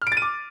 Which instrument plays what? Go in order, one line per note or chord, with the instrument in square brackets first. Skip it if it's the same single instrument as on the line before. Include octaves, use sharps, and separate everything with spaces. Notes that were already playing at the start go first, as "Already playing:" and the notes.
[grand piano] F6
D7
A6
D#7
D6